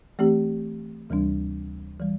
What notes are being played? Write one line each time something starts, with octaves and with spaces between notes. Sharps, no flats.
E3 A3 C4 G4
D2 C3 E3 G3 D4
E3 G3